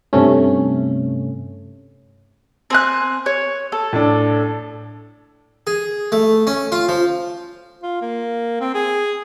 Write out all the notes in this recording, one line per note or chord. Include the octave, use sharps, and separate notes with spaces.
G2 C3 A3 C#4
C4 G#5 F#6
C#5
A4
A2 D4
G#4
A3
C#4
F4
F3
F4
A#3
C4
G#4